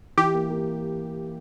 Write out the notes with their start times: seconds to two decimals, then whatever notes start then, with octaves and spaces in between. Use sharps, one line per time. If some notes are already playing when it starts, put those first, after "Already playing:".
0.17 E3 G4
0.34 A#3
0.50 A#3